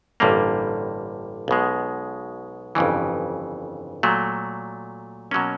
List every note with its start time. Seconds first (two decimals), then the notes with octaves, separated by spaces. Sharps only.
0.20 A1 G2 D3 G3 A#3
1.48 B1 B2 G#3
2.75 G1 F2 C#3 E3
4.03 A#2 F#3 A3
5.31 B2 F#3 A#3 C#4